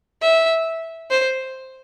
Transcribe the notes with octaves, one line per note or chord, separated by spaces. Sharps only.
E5
C5